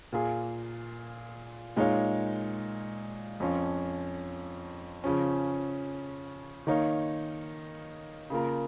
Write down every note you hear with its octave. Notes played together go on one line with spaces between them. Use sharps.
A#2 A#3 F4 G#4
A#2 G#3 D#4 C#5 F5
F2 F3 C#4 F4
C#3 F3 C#4
D#3 A#3 D#4 C#5 F5
C#3 A#3 F4 A#4